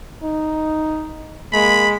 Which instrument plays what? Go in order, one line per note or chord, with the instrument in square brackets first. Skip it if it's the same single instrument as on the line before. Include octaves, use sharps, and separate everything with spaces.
[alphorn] D#4
[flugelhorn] G#3 [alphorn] A#3 [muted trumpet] B5